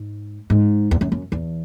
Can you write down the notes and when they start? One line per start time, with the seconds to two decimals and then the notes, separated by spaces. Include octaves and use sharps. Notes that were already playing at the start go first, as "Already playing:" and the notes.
Already playing: G#2
0.50 G#2
0.91 E2
1.01 F#2
1.12 F#2
1.32 E2